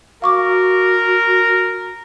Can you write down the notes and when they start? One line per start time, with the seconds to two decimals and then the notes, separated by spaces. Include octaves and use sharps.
0.22 F#4 A#4 F5 C#6 D6